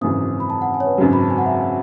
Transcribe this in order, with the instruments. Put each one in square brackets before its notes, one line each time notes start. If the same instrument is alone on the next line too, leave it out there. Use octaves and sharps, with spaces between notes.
[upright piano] G#1 F#2 C#3 E3 [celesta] D#6
[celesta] B5
A5
F#5
G#5
C#5
B4
[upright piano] G#1 F#2 C#3 F#3
[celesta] B5
A5
G#5
F#5
E5